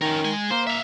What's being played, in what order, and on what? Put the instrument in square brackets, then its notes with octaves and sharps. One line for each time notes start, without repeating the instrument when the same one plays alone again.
[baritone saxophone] D#3 [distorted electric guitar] C#4 A#4
[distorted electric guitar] G#3 G#5
[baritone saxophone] A#3 [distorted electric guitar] C5
[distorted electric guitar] E5 F5